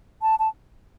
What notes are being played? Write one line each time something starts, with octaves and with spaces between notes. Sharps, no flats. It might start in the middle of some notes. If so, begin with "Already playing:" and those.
A5
A5